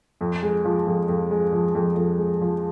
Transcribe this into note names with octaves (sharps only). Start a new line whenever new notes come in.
F2
G#3
F3
F2
F2
G#3
F3
F2
F2
G#3
F3